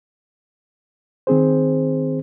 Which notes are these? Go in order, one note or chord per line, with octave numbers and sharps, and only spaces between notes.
D#3 C4 G#4 C5